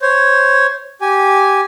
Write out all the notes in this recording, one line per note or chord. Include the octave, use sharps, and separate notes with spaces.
C5 C#5
G4 G#5